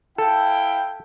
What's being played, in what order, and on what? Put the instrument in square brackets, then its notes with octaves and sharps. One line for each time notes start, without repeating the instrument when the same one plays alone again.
[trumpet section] E4 F5 G5 [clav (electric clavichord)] A4